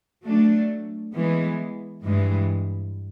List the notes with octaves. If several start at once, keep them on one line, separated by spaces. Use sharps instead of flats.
F#3 A3 D4
E3 G#3 B3
G2 E3 G#3